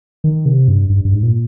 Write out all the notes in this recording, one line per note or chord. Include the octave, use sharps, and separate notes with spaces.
D#3
C3
G2
G2
G2
G#2
A#2